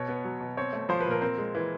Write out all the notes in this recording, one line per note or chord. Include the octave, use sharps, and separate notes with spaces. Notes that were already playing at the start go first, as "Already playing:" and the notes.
Already playing: B2 C#5
B3
F#3
B2
C4 C#5
A3
F3 C5
B4
A#2
A#4
C4 A#4
G#3
E3